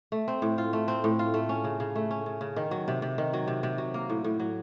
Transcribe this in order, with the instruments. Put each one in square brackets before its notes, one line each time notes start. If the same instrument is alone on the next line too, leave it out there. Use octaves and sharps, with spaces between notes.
[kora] A3
C4
A2
F4
A3
C4
A2
F4
A3
C#4
C#3
C#3
A3
C#4
C#3
C#3
D#3
F#3
C3
C3
D#3
F#3
C3
C3
F#3
A#3
A2
A2
F#3